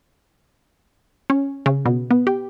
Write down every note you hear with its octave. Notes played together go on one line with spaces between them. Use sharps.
C#4
C#3
B2
B3
G4